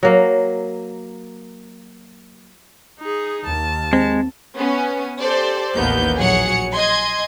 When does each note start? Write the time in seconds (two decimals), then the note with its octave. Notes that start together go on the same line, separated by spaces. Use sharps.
0.03 F#3 A#3
3.00 D#4 G#4
3.46 D#2 A5
3.93 G#3 C4
4.56 B3 C#4
5.20 G4 A4 C5 D5
5.76 A1 D#2 A#3 B3 G6
6.16 A#1 F#3 G#4 C#5 F#5 C#7
6.73 D#5 G#5 C6 G#6